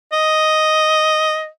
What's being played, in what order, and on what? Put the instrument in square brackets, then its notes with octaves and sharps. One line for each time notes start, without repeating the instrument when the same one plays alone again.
[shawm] D#5